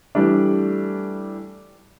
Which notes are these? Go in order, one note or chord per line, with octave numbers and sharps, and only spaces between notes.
E3 G3 A3 D4